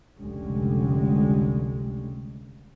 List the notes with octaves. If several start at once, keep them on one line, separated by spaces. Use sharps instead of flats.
F1 C#2 D3 G3 G#3 C#4